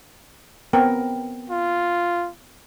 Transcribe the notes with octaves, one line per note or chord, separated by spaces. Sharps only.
B3 C4 A#4 G5
F4